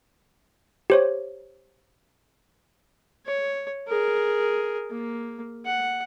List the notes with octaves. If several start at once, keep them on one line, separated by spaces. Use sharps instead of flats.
G4 C5 C#5
C#5
G#4 A#4
A#3
F#5